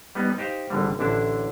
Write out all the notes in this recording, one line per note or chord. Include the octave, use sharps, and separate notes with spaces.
G3 B3 D#4
D#4 G4 C5 F5
G#1 D3 G3
A1 D3 D4 E4 A5